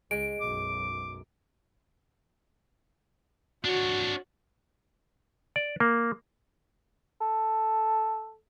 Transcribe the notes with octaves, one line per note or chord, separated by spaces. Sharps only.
C#2 G#3 D7
B1 F#2 D6
D4 F#4 C#5
D5
A#3
A4